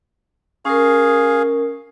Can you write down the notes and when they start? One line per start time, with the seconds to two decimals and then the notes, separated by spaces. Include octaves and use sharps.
0.65 C#4 G#4 A#4 F5